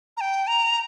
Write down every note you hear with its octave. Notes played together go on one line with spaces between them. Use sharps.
A#5
G5
A#5